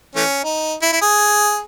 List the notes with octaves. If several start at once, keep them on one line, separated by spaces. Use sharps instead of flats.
E3 A3 C#4
D#4
E4
E4
G#4